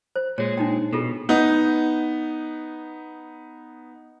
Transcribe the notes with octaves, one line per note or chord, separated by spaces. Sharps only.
C5
A#2 G#3 C#5
D4 D#4 G5
B2 F4 G#4 A4
B3 D#4